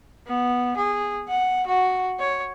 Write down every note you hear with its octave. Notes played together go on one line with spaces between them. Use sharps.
B3
G#4
F#5
F#4
C#5